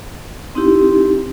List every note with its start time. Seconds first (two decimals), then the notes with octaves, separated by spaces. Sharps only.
0.55 C4 D#4 E4 G4